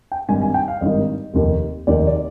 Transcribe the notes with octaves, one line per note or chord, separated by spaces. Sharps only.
G5
G#1 G2 D#3 G#5
G#5
G5
F5
G#1 G2 D#3 D#5
F1 D#2 D#3
F1 D#2 D#3 D5
D5